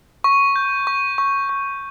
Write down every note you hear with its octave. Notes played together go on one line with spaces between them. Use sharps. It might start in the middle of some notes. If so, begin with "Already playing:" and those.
C#6
G6
C#6
C#6
C#6